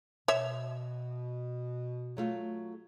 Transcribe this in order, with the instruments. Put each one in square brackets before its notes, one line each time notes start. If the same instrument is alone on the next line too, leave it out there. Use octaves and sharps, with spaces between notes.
[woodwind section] B2 [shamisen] C#5 E5
[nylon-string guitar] F#3 A3 F4